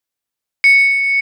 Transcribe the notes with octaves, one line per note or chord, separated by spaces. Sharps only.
C#7